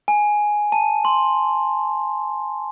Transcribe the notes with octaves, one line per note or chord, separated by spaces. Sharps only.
G#5
A5
C6